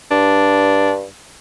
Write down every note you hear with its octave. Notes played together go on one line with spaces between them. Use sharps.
G2 D4